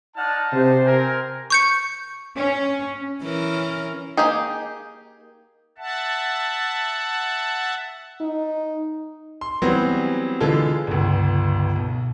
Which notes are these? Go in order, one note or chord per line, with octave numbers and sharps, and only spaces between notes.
D#4 D5 F#5 A5 F6
C3 C5
C4 A#4 G#5
C#6 G6 C#7
C#4
E3 C#4 A#4
A#3 D#4 G4 G#4
E5 F#5 A5
D#4
C6
E3 F#3 G3 B3 C4
D3 E3 G#3 F4 A4
G1 C#2
B1